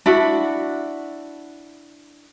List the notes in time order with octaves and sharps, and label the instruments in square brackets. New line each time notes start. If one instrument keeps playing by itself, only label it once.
[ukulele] D4 E4 F#4